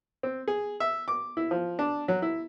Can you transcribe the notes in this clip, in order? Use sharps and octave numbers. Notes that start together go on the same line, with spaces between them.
C4
G#4
E5
D6
E4
F3
D4
F#3
E4